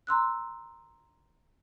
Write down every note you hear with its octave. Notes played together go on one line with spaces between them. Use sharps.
A#5 C6 E6 F#6